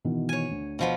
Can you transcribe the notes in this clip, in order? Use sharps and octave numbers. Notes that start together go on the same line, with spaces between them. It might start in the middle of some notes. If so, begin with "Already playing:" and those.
B2 D#3 E3
C#5 G#5
D2
B2 F3 B3